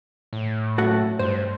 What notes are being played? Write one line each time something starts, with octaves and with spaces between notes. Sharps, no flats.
A2
F#3 A3 F#4 A4 F#5
G2 C5